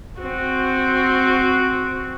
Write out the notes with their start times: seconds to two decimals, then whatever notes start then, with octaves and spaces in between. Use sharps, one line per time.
0.20 C4 F#4